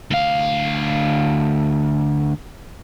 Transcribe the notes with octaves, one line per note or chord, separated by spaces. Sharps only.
D2 F5